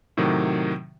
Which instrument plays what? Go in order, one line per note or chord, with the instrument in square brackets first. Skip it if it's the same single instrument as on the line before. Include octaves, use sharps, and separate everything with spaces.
[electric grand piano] A2 C3 D#3 F#3